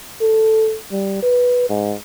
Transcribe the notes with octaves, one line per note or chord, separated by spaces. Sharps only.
A4
G3
B4
G#2